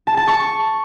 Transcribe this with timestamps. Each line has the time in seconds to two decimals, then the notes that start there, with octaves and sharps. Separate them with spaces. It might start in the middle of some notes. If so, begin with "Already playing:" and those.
0.07 A5
0.17 A5
0.28 C#6